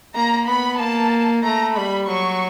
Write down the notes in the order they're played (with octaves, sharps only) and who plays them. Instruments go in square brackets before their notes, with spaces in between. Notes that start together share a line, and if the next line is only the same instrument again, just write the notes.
[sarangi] A#3 [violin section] A#5
[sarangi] B3 [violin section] B5
[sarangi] A#3 [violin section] A5
[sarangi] A3 [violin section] A#5
[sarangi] G3 [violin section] B5
[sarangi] F#3 [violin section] C#6